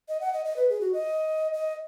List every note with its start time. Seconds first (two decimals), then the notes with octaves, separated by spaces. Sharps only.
0.09 D#5
0.21 F#5
0.33 D#5
0.45 D#5
0.56 B4
0.70 G#4
0.81 F#4
0.93 D#5
1.54 D#5